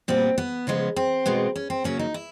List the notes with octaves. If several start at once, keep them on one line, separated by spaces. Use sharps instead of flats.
A#2 G3 B3 C4
B3
C#3 F3 G#3 B3
C4
B2 G#3 B3
C#4
C4
C#3 F#3 A#3 C#4
D#4
E4